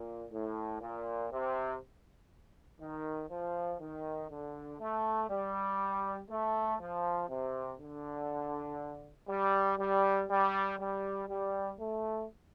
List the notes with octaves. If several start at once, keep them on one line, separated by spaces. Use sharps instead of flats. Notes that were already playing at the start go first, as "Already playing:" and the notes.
Already playing: A#2
A2
A#2
C3
D#3
F3
D#3
D3
A3
G3
A3
F3
C3
D3
G3
G3
G3
G3
G3
A3